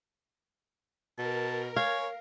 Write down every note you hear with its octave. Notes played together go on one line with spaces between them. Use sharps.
B2 A#4 A5
C#5 F5 G#5